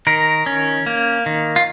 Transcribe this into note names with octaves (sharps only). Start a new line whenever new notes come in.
D#3 A#4
C#4
A#3
D#3
F4